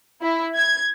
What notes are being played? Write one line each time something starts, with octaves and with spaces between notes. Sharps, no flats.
E4
G#6